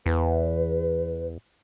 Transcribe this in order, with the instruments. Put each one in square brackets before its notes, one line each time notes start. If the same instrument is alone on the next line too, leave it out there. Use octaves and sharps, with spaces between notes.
[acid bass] E2 [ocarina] B4